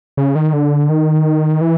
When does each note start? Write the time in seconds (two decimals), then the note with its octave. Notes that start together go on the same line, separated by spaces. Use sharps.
0.17 C#3
0.35 D#3
0.53 D3
0.89 D#3
1.61 E3